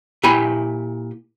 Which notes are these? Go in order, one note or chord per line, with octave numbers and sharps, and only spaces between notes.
A#2 E4 G4 G#5 B5